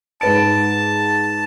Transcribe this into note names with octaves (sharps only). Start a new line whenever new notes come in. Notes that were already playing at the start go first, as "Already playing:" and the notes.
G#2 B4 A5 D7